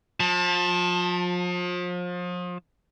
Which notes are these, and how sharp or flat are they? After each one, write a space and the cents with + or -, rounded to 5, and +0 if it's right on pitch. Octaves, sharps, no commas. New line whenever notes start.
F3 +35 A5 +0